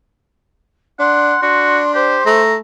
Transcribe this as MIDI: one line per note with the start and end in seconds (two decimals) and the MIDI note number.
0.99 1.35 62
0.99 1.39 78
0.99 1.92 84
1.43 2.17 62
1.43 1.80 66
1.94 2.22 67
1.94 2.41 72
2.26 2.57 57
2.26 2.55 82